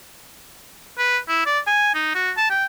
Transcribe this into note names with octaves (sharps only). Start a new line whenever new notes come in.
B4
E4
D5
G#5
D#4
F#4
A5
G5